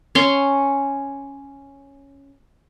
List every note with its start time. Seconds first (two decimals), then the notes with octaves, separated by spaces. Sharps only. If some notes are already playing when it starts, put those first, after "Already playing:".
0.15 C#4 C6